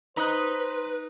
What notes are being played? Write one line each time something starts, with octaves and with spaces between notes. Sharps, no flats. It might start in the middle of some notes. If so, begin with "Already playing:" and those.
D#4 B4 C5 A#5 D#6 F#6